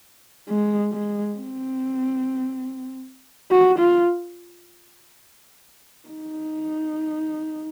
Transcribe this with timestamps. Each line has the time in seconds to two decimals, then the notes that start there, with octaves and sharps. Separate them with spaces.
0.49 G#3
0.93 G#3
1.35 C4
3.51 F#4
3.79 F4
6.09 D#4